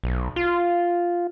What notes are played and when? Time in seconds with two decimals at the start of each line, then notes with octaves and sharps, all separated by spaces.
0.04 B1
0.36 F4